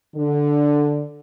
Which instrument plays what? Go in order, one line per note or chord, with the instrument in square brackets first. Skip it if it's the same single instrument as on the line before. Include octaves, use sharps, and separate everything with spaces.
[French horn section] D3